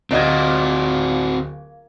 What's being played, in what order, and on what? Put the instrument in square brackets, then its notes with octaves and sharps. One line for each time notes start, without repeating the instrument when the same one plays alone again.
[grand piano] D1 D#5 G#6 [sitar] A#2 [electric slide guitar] C4 F#4